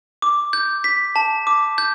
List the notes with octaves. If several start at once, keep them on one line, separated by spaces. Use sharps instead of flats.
D6
G6
B6
A5
D6
G6